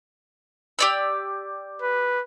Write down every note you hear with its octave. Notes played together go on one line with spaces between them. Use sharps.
G4 D5 E6
B4